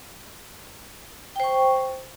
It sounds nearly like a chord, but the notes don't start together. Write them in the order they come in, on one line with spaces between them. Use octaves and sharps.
G5 C5 C#6